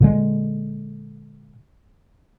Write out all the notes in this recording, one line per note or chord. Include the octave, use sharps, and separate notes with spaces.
A#2 D3 G#3